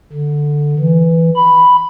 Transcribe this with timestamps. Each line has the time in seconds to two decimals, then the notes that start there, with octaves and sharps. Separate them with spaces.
0.13 D3
0.79 E3
1.36 B5